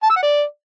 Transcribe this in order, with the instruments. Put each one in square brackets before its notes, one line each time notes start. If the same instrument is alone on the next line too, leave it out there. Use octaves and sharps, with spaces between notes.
[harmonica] A5
E6
F#5
D5